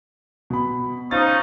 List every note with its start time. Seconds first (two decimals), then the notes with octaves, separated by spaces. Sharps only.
0.50 B2 B5
1.11 F3 C#4 D#4 A6